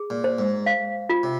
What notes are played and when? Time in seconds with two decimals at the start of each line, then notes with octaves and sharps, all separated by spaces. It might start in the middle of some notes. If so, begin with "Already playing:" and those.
Already playing: G#4
0.10 A#2
0.24 C5
0.39 G#2
0.66 F5
1.09 F4
1.23 C3